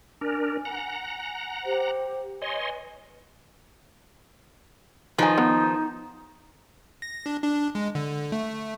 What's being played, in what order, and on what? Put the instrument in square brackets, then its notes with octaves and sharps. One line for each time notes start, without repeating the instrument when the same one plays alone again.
[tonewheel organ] D4 A#4 [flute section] G#5
[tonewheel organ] F#5 A#5
[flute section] G4 C5
[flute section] B4 G#5 [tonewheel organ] C#5 D#5 C6
[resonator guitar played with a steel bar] D#3 F3 [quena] D#4 [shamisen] B4 G#5
[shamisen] B3
[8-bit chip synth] A#6
D4
D4
G#3
D3
A3